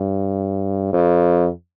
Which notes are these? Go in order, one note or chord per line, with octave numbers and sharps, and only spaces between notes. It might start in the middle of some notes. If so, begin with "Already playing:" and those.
Already playing: G2
F2